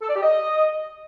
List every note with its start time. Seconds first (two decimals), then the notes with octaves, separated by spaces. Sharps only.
0.02 A4
0.09 D5
0.16 G4
0.23 D#5